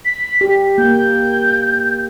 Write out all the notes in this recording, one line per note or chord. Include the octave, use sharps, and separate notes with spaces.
B6
G4
A#3 G6